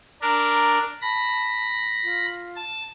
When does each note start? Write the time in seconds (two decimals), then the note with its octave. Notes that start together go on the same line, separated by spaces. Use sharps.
0.21 D4 A#4 A#5
1.02 A5 B5 A#6
2.03 F4
2.56 A5